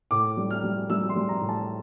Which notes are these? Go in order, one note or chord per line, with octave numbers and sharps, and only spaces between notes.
A2 D6
G3
F6
G3
G3 E6
C6
G3
A#5
A2
A5